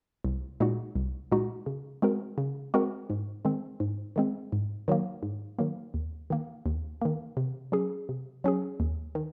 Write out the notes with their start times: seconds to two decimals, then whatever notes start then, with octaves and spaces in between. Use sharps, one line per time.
0.25 C2
0.60 A#2 G#3 D#4 F#4
0.95 C2
1.32 A#2 G#3 D#4 F#4
1.66 C#3
2.02 G#3 C4 F#4 A#4
2.38 C#3
2.74 G#3 C4 F#4 A#4
3.10 G#2
3.45 D#3 G#3 C4
3.80 G#2
4.16 D#3 G#3 C4
4.52 G#2
4.88 D#3 F#3 A#3
5.23 G#2
5.59 D#3 F#3 A#3
5.94 D#2
6.30 D#3 A#3
6.66 D#2
7.02 D#3 A#3
7.37 C3
7.72 F#3 C#4 G#4
8.09 C3
8.44 F#3 C#4 G#4
8.80 D#2
9.15 D#3